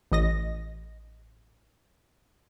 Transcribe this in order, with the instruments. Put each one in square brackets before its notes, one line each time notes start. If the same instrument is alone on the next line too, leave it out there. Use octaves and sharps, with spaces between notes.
[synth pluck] A1 D#5 A#6